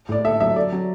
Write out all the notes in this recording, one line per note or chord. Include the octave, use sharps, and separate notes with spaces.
A2 D5
A4 E5
F#3 E5
A4 D5
F#3